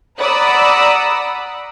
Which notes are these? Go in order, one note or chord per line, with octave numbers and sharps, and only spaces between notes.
D5 F#5 A#5 B5 D#6 E6